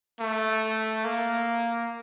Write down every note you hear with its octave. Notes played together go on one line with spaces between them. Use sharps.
A3
A#3